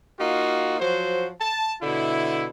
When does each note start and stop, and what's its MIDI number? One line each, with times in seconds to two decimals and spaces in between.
0.19 0.76 58
0.19 0.76 63
0.19 0.76 65
0.19 0.76 66
0.80 1.29 53
0.80 1.29 54
0.80 1.29 66
0.80 1.29 72
1.40 1.75 81
1.82 2.46 47
1.82 2.46 50
1.82 2.46 64